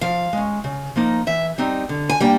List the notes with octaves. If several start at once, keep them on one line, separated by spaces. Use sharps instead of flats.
F3 F5
G#3 C#4
C#3
F3 A#3 D#4
E3 E5
G3 C4 D#4
D3
G#5
G3 A#3 D4 G5